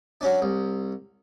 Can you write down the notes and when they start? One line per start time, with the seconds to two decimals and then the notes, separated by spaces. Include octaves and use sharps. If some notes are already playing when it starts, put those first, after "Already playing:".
0.21 F#3 C#4 D4
0.42 C2